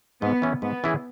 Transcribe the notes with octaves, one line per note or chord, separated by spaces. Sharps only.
G#2 B3
E3 C#4 E4 G#4
G#2 B3
E3 C#4 E4 G#4